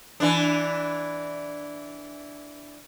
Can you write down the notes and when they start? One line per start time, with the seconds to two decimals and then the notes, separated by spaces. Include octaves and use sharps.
0.20 E3 D4